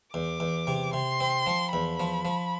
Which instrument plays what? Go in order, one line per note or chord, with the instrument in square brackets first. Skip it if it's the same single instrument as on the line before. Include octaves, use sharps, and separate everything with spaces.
[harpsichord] E2 [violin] D6
[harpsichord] E2
C3
[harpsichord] C3 [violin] C6
[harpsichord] C4
F3
[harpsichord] E2 [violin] B5
[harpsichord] F3
F3